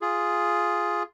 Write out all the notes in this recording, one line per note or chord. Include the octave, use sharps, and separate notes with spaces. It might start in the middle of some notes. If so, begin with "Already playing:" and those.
F4 G#4